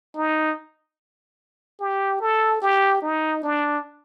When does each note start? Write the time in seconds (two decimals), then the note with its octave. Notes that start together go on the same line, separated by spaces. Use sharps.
0.16 D#4
1.80 G4
2.20 A4
2.61 G4
3.02 D#4
3.43 D4